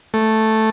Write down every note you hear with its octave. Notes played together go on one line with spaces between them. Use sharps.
A3